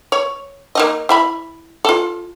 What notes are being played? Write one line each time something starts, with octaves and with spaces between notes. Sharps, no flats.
C#5
A#3 D#4 D#5
E4 E5 B5
F4 A4